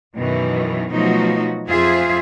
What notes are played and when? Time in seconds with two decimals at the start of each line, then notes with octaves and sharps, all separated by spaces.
0.15 F#2 B2 D#3 E3
0.91 B2 F3 F#3 A3 D#4 F#4
1.68 F2 F4 G#4 C5 E5